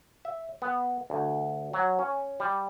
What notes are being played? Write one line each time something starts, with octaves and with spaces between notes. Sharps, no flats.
E5
B3
D2
F#3
C#4
G3